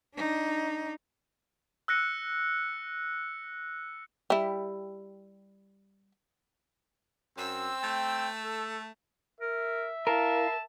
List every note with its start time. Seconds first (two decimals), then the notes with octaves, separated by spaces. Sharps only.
0.15 D4 D#4
1.88 E6 F#6 A#6 C#7 D#7
4.30 G3 E4
7.38 F#2 C4 E6 E7
7.83 A3 G5
8.44 A4
9.40 A#4 E5
10.07 E4 A#4 F5 A5